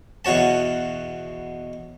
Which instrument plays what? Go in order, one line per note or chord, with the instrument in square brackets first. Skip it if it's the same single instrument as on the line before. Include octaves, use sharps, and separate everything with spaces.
[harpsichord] E2 B2 F#4 C#5 A5